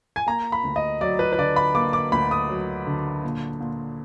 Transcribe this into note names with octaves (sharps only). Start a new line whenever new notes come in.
G#5
A#3 A#5
B5
D2
D#5
F#3 D5
B4
B4
D3 D5
B5
A#3 D6
D6
D2 B5
D#6
F#3
D3
A#2
A#2